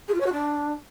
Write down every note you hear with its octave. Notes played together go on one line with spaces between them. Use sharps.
G#4
F4
C#5
F#4
D4